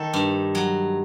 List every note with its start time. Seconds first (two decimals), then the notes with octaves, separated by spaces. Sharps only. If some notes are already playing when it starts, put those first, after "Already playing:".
Already playing: D#3 A4
0.14 G2
0.55 F#3